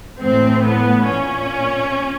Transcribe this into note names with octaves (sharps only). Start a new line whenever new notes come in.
A2 E3 C4
B3
A#2 C#4